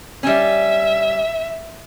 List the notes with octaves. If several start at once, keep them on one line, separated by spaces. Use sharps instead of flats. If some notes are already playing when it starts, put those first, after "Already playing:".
G3 C#4 E5